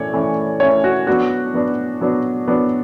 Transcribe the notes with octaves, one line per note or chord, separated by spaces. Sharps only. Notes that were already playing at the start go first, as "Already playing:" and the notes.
Already playing: E3 A3 C#4 C#5 D5
E3 A3 C#4 E4
E3 A3 C#4 E4 C#5
F#4
F#3 B3 D4 F#4
F#3 B3 D4
F#3 B3 D4
F#3 B3 D4